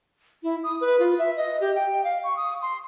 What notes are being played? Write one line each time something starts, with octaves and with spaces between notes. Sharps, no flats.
E4
D#6
B4
F4
E5
D#5
G4
G5
F5
C#6
D#6
C6